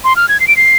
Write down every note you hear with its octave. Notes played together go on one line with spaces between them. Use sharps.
C6
F6
G#6
C7
D7
C7